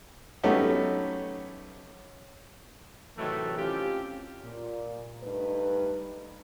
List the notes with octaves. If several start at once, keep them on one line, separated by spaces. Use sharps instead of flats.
F#3 A3 B3 C#4 D#4 G4
A2 C3 D#3 E3 F#3 A3
C4 C#4 F4 G4
A#2
G2 A3 D#4 B4